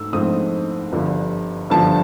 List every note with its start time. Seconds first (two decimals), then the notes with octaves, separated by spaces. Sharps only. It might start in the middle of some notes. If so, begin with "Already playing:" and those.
Already playing: G#2 A3 E6
0.13 G#2 F3 A3 C4 D#6
0.92 G1 G2 D3 F3
1.70 G1 G2 D3 F3 A5